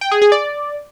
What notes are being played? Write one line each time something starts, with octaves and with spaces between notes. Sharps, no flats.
G5
G#4
G#4
D5